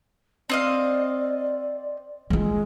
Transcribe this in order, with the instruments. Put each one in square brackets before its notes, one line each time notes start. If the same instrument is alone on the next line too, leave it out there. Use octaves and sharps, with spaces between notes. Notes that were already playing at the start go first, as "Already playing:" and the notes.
[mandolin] C4 D#5 F5 [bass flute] D5
[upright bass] E3 F4 [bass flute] G#3